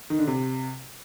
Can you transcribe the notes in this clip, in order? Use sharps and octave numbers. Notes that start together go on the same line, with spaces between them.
D#3
D3
C3